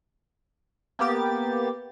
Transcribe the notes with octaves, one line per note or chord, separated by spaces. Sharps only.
A#3 B3 G4 A6